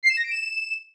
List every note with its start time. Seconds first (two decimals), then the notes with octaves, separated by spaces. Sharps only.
0.03 C7
0.10 E7
0.17 A#6
0.24 D7
0.31 E7